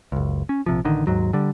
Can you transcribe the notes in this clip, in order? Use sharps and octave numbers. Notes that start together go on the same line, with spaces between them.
F#1 C#2
C#4
A#1 C3 F3
A1 D3 D#3
D#2 G#2 F#3
D3 G3